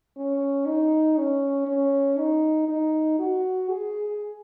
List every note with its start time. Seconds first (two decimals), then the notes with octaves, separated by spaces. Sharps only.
0.17 C#4
0.67 D#4
1.17 C#4
1.67 C#4
2.18 D#4
2.68 D#4
3.19 F#4
3.70 G#4